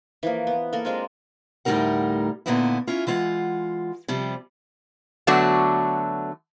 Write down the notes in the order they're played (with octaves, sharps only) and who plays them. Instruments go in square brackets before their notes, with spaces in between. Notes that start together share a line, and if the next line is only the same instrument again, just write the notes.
[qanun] E3 F3 A#3
B3
A#3 A4 A#4
G#3 C4 D4 F4
[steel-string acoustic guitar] D2 A2 G3 D#4 A#4 F#5
A#2 D3 A#3 B3 D#4 E4
C#4 E4 F4
E3 G#3 F4 F#5
C3 F3 G3
[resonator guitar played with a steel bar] D3 F#3 A3 B3 D4 F#4